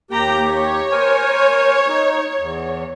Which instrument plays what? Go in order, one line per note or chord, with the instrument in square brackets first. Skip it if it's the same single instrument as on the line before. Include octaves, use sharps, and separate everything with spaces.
[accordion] D#2 G4 [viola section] A#3 G5 A#5
[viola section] C#5
[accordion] A#4 C5 G#5
D#4
E2